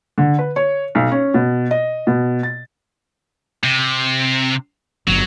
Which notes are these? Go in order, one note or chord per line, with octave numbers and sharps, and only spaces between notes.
D3
B4
C#5
B1
C#4
B2
D#5
B2
A6
C3
G1 F#3